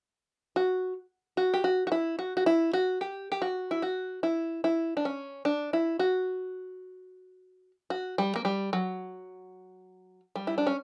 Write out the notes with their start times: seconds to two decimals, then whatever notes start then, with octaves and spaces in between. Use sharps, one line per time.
0.56 F#4
1.37 F#4
1.54 G4
1.64 F#4
1.87 F#4
1.92 E4
2.19 F#4
2.37 F#4
2.46 E4
2.73 F#4
3.01 G4
3.32 G4
3.42 F#4
3.71 E4
3.82 F#4
4.23 E4
4.64 E4
4.97 D4
5.05 C#4
5.45 D4
5.73 E4
5.99 F#4
7.90 F#4
8.18 G3
8.36 A#3
8.45 G3
8.73 F#3
10.36 G3
10.47 E4
10.58 D4
10.67 C#4